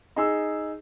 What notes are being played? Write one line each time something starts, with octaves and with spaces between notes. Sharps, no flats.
D#4 G#4 E6